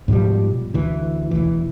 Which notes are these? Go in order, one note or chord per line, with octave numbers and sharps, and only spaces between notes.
G#2 B2 F3 G3
D2 E3
E1 E2 E3